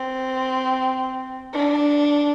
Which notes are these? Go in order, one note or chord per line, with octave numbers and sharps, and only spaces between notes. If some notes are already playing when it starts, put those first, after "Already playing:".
Already playing: C4
D4